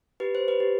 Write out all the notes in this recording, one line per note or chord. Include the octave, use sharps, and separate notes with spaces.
G4 B4
C5
B4
G4